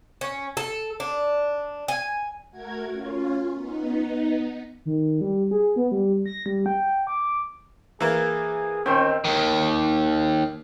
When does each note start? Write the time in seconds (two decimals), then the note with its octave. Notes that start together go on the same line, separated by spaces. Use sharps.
0.21 C#4
0.57 A4
1.00 D4
1.88 G#5
2.51 A3 F#4 A#4 G#6
2.91 C#4 F4
3.55 B3 D#4
4.85 D#3
5.21 G3
5.51 G#4
5.76 B3
5.92 G3
6.26 A#6
6.46 G3
6.66 G5
7.07 D6
8.00 E3 A#3 G#4
8.86 A#2 D#3 C4 C#4
9.25 D#2 D#3